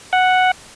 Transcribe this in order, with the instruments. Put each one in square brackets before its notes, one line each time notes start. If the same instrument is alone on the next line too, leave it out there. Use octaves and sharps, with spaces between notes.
[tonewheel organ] F#5